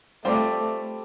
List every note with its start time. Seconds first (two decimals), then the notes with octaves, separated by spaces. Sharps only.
0.25 G3 A3 C4 F4 A#4 D5